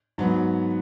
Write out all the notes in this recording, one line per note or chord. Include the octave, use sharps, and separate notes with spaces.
G#2 F#3 B3